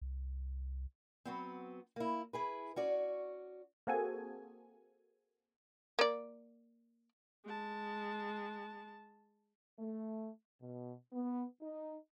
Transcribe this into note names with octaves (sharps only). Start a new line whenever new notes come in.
C2
F#3 B3 C4
A#3 E4
E4 G#4 B4
C#4 F#4 D5
A#3 C4 F#4 G#4 A4 G#5
A#3 D5
G#3 A5
A3
B2
B3
D#4